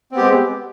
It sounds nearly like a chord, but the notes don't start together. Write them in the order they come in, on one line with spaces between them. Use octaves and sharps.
C4 B3 G4 G#3